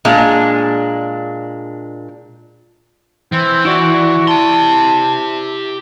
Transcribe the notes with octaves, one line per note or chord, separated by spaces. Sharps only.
A#2 G#3 D4
E3 C4
E4 F#4 D5
G4 A5 C6